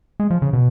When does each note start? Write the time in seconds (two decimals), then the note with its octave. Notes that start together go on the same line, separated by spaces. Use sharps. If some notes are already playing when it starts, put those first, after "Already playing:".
0.20 G#3
0.30 F3
0.42 C#3
0.53 B2